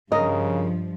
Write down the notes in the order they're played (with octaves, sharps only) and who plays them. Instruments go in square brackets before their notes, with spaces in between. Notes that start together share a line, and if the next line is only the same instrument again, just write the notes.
[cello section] G2 F3 [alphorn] C#3 [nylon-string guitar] A#4 [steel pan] D#5